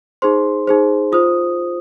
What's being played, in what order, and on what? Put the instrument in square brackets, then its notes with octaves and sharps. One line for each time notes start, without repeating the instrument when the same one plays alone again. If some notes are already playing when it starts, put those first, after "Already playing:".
[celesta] D#4 G#4 C5 C6
D#4 G#4 C5
F4 C5 D#6